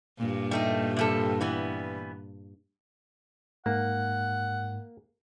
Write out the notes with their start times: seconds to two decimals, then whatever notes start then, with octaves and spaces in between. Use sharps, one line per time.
0.18 G2 A#2
0.51 G3 A3 D#4
0.97 C3 G3 A4
1.41 E3 G3 B3
3.66 G#2 A#3 F#5